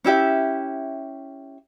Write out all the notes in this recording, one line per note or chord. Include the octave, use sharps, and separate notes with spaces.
C#4 E4 G4 E5